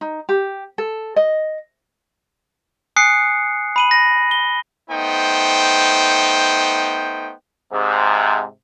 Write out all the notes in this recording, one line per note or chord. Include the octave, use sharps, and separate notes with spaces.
D#4
G4
A4
D#5
G#5 D#6 F#6 C7 C#7
B5 D#7 F#7
A#6
G7
A3 B3 D#4 C5 G5
G#2 C3